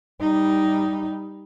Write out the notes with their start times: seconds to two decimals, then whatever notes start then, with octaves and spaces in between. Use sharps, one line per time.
0.20 G3 D#4